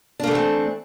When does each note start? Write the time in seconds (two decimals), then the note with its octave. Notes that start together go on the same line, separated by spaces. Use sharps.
0.20 D4
0.23 A#3
0.27 A3
0.31 E3
0.35 C4